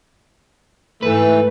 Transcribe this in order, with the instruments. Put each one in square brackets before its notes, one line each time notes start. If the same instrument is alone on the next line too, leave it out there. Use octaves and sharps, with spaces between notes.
[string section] G#2 A3 [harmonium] E3 [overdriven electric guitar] B4